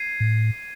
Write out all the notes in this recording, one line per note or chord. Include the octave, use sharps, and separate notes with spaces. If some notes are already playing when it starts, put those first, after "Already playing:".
Already playing: G#6 C7 D#7
A2